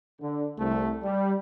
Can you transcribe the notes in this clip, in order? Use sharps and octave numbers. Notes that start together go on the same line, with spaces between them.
D3
C2 A3
G3